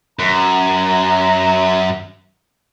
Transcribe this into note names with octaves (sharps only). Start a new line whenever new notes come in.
F#2 A#5